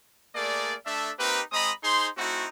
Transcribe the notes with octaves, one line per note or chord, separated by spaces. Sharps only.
A3 A#3 G#4 A#4 D5
A3 D4 A4 E5
A#3 C4 D#4 G4 B4
G#3 C4 D#5 A#5 B5 D#6
D#4 G#4 C5 C6
A3 C4 D#4 E4 F#4